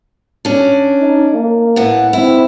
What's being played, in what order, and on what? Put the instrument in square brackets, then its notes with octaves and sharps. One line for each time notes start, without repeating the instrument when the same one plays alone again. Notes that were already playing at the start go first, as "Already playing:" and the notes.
[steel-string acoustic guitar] C#4 D4
[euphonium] D#4
A#3
[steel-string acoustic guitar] A2 B4 F#5
[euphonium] C4 [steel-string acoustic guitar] E4